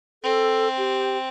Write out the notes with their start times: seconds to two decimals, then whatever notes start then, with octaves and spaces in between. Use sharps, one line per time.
0.23 C4 A4
0.77 G4